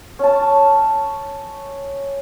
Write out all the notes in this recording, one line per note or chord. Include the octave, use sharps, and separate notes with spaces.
C#4 A5